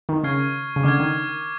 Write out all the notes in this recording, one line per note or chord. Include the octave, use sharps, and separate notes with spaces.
D#3
C#3 C#6 F6 G#6 C7
C#3
D3 D6 F6 G#6
D#3